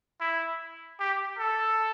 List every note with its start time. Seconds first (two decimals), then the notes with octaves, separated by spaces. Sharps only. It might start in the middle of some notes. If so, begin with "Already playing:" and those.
0.21 E4
1.00 G4
1.39 A4